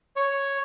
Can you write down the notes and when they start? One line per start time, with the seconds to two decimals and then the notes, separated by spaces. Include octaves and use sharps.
0.16 C#5